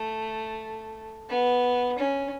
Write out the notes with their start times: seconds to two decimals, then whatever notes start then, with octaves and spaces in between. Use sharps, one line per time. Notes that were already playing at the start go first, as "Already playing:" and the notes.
Already playing: A3
1.29 B3
1.98 C#4